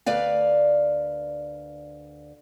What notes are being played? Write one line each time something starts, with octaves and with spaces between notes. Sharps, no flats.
D2 B4 D5 F5